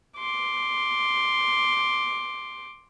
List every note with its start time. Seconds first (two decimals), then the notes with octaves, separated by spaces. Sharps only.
0.18 C6 D6